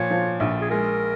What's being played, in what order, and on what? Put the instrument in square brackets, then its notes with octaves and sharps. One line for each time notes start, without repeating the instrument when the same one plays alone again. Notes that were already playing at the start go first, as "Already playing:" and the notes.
Already playing: [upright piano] A#2 F3 [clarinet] C#5
[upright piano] F3
A#1
[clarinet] G#4
[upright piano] G#3 [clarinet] A#4